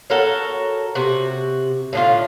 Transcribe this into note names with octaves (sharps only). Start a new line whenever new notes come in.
F#4 A4 A#4 C#5
C3 F#4
A2 D3 F4